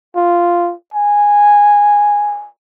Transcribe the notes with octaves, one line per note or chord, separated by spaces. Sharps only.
F4
G#5